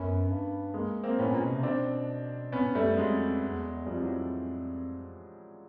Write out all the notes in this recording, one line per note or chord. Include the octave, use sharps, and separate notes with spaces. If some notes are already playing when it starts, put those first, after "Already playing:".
Already playing: F#2 B3 C#4
G2
G#3 A#3
A#3 C4
A2 B3 C#4
A#2
B2
C3
B2 C4 D4
A#2 B3 C#4
G#2
G2 G3 A3
F#2
F2 F#3 G#3
E2
F2 F3 G3
E3 F#3